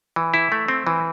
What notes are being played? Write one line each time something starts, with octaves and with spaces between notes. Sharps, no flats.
E3
E4
A3
C4
E3